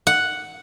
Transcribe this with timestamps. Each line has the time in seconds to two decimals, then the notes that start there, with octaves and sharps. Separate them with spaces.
0.07 F#5